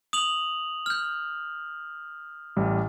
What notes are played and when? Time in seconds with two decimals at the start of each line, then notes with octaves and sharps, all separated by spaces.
0.13 D#6 F7 F#7
0.86 F6 G6
2.57 A1 G3